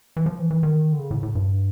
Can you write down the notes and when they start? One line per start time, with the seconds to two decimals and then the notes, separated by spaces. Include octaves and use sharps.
0.17 E3
0.26 F3
0.39 E3
0.51 E3
0.63 D#3
0.93 D3
0.99 C#3
1.11 A2
1.23 A2
1.35 G2